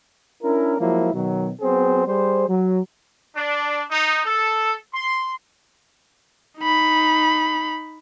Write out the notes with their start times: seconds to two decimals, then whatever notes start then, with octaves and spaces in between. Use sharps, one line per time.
0.43 C#4 D4 E4 A#4
0.79 F3 F#3 G#3 A#3 E4
1.13 B2 D#3 F#3
1.61 F#3 B3 C4 G#4 C5
2.06 G3 G#4 C5
2.48 F#3
3.36 D4
3.91 D#4
4.24 A4
4.94 C6
6.59 D#4 B5